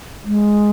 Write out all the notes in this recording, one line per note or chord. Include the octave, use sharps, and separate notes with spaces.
G#3